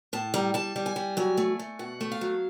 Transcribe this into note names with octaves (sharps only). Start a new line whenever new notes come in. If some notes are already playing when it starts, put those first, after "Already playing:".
A2 A5
G3 A#5
G3 A5
G3
G#5
G3
F#3 G#5
A3
A3
B2 F#5
A3
F5
F#3